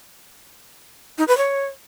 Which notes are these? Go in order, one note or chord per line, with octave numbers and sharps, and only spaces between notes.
D#4
B4
C#5